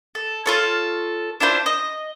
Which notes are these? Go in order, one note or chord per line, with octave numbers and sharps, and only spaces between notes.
A4
F4 A4 C#5
D4 E4 F4 C5
D#5